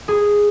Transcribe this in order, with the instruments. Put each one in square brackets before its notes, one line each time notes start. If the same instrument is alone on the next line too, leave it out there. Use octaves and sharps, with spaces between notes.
[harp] G#4